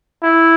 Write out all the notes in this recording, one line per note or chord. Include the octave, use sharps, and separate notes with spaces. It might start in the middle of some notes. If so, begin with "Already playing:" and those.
E4